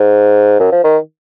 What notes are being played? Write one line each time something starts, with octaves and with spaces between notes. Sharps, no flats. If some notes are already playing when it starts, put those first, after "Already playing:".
Already playing: G#2
F#2
F3
D#3